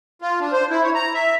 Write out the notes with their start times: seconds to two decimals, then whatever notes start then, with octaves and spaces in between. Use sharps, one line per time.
0.22 F4
0.40 D4
0.52 C5
0.70 E4
0.83 C#5
0.95 A#5
1.14 E5